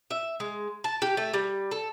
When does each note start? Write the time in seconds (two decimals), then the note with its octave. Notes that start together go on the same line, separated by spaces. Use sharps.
0.11 E5
0.40 G#3
0.84 A5
1.02 G4
1.17 A3
1.34 G3
1.71 A4